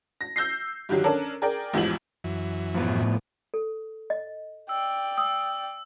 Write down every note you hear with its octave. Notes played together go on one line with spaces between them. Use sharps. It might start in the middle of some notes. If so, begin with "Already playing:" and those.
A#6
E6 G6 A#6 C7
G2 D3 D#3 F#3 G3
C#4 D4 A4 A#4
G#4 A#4 D5 G5
A1 E2 G#2 E3 F3 F#7
F#2 E3
F2 A2 B3
A4
D#5
D5 G5 E6
D#6 E6